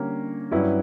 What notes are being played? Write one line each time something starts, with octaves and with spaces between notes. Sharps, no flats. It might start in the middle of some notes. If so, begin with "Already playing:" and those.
Already playing: D3 G3 A#3 C#4
G2 F#3 C#4 E4 B4